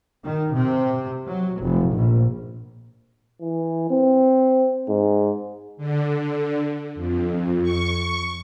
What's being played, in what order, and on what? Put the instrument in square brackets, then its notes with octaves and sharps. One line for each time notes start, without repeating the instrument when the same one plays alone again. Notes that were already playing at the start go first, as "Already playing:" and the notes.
[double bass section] D#3
C3
F#3
F1
A#1
[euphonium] E3
C4
G#2
[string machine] D3
F2
C#6